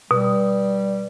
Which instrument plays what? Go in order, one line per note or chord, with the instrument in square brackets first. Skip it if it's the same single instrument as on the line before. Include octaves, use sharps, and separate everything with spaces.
[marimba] B2 [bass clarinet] G3